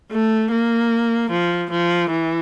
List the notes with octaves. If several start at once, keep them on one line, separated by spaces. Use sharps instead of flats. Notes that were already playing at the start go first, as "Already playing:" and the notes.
A3
A#3
F3
F3
E3